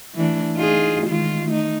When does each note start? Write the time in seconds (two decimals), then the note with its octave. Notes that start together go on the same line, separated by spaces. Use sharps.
0.15 E3 A3 D4
0.56 D#4 F4 G#4
1.05 D#3 G#3 F4
1.46 A3 D#4